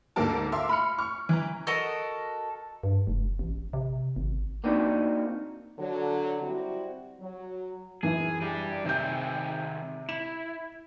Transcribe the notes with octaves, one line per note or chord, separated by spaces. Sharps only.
D2 G#2 A#3 A4 A#4 A5
E5 F5 C6 D6
B5 F6 C#7
C#6 F6
E3 A#5
F#4 A4 A#4 D#5
G2
F1
A1
C3
G#1
A#3 C4 D4 D#4 F#4
D3 F#3
G3 C4 E4 F#4
F#3
F#2 E3 G#4
G3 D4 G4
C3 D#3 C4 G#4 G6
E4 E7